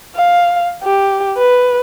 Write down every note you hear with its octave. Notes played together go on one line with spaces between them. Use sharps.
F5
G4
B4